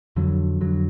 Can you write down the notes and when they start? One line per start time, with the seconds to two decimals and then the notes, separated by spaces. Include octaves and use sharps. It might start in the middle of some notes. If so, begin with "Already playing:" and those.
0.16 F2 D3 F#3
0.61 F2 D3 F#3